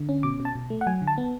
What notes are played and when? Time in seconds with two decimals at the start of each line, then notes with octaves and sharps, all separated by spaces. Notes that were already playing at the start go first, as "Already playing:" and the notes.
Already playing: D3
0.09 C#4
0.23 B2 D6
0.40 B2
0.45 A5
0.55 B2
0.70 A3
0.81 F#5
0.87 F#3 G#5
1.02 D3
1.07 A5
1.18 B3